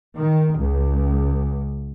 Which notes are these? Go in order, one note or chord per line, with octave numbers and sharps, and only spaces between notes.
D#3
C#2